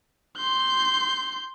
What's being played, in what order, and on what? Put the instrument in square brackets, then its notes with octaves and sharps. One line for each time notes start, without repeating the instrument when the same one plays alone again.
[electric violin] C6 G6